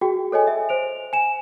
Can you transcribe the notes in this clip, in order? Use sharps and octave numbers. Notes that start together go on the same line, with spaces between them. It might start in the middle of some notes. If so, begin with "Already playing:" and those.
F#4 G#4 G5
A4 C#5 D#5 G#5
E5
C5 D7 F7
G#5 E7